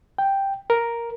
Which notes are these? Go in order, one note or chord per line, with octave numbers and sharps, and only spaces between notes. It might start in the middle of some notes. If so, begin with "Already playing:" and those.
G5
A#4